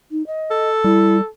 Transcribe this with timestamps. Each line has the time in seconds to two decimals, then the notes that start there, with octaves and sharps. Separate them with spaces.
0.11 D#4
0.27 D#5
0.51 A4
0.84 G3 E4